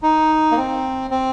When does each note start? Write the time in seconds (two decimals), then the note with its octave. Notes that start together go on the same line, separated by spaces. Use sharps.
0.03 D#4
0.52 A#3
0.57 C4
1.11 C4